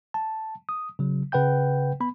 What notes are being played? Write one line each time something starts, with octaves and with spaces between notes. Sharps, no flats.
A5
D#6
C#3 F#3
C#3 B4 F#5 G5 G6
B3 B5